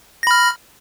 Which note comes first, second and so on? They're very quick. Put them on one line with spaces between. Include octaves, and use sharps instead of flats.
A#6 B5 F6